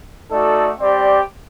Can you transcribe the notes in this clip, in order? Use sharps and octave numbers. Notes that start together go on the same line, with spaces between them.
A3 D#4 F#4 A4 D5
G3 C4 G4 D5